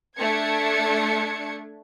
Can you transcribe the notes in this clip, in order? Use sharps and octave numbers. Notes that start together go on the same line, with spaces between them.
A3 D4 G#6 C#7